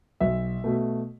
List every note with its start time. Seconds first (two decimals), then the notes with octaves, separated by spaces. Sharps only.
0.20 B1 E5
0.64 B2 A3